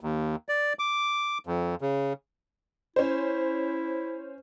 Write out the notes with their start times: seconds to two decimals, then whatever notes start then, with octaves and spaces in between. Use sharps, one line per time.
0.01 D#2
0.49 D5
0.79 D6
1.47 F2
1.81 C#3
2.96 C#4 E4 C5